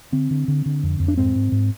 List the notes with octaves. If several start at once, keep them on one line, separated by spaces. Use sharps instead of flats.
D3 C4
D3
D3
D3
F2
F2
D4
G#2 C4
G#2
G#2